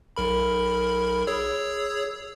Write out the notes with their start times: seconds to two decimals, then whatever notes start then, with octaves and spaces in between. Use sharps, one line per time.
0.16 B1 A#4 B5
1.27 G#4 C#5 E6